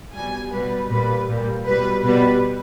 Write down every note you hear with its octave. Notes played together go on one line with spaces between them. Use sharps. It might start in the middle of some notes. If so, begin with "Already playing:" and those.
B2 G3 G#5
B2 G3 B4
A#2 G3 B4
A#2 G3
B2 G3 B4
B2 G3 B4